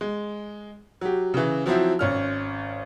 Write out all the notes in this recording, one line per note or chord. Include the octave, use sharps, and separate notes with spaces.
G#3
F#3 G4
C#3 E3
F3 F#3 C4 E4
G#1 C#4 F6